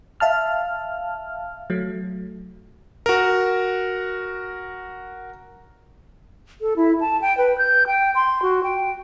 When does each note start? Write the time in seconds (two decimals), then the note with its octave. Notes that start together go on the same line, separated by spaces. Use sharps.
0.20 E5 F5 A5 F6
1.70 F#3 A3
3.06 F#4 A#4
6.61 A4
6.76 E4
7.01 A5
7.22 G5
7.38 B4
7.58 G6
7.87 G5
8.15 C6
8.42 F#4
8.63 G5